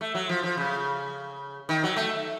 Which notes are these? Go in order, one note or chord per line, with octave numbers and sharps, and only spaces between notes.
A3
F#3
F3
F3
C#3
D#3
F#3
A3